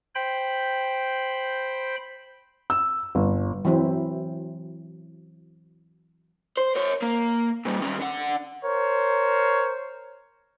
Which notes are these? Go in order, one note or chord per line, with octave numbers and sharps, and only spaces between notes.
C5 G5 B5
E6
G1
E3 F#3 C4 E4
C5
A#4 C#5
A#3
A#2 G3
D#3 C#4
D3 F#5
A#4 C5 C#5